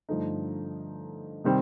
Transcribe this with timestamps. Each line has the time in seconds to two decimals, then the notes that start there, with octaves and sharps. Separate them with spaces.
0.09 G2 D3 F3 A3 D#4
1.44 C3 D#3 G3 C4